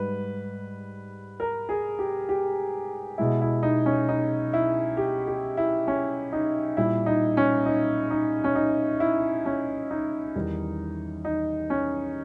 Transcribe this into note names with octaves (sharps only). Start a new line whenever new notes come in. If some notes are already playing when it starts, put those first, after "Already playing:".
Already playing: G#2 G3 B4
A#4
G#4
G4
G4
B2 G#3 E4
E4
D#4
C#4
D#4
E4
G4
G4
E4
C#4
D#4
A#2 G3 E4
D#4
C#4
D#4
D#4
C#4
D#4
E4
C#4
D#4
E2 D#3 G3
D#4
C#4